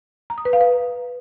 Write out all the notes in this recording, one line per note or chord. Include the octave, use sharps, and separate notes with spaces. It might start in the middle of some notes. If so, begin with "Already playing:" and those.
A#5
D#6
B4
F5
B4